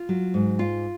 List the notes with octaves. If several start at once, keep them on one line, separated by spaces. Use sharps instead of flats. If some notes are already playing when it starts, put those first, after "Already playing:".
Already playing: F4
F#3
G#2
F4